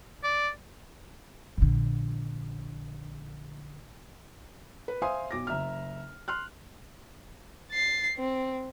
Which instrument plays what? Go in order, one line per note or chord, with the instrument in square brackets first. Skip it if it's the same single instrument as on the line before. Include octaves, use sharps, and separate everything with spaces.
[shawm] D5
[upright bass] A#1 D3
[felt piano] B4
C5 E5 F5 G#5 C6 D#6
B1 D6 A#6
F#1 E5 A#5 F6
C6 F6 F#6
[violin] A6 C7
C4